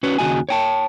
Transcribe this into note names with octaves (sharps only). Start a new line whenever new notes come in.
C#4 F#4 B4 C#5
D#2 C#3 C4 F#4 D#5 G#5
C#5 G5 A5